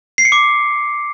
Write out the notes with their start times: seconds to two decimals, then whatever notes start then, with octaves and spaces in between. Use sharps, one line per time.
0.18 C7
0.25 C#7
0.32 D6